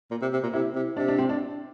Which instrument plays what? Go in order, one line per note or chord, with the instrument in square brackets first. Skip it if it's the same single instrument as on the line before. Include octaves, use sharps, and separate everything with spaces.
[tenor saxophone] A#2
C3
C3
A#2
[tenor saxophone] C3 [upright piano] E4
[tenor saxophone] C3
[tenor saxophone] C3 [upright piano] D4
[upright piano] D4
C4
D4